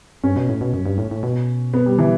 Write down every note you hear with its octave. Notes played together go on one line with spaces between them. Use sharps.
G2 C#4
B2
A2
B2
F#2
G2
A2
A2
B2
B3
G3
E3